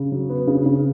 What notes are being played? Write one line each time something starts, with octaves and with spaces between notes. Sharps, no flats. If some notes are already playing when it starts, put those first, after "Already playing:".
Already playing: C#3
F#3
B3
C#3
C#3